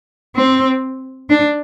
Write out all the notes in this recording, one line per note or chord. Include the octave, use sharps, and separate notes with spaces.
C4
D4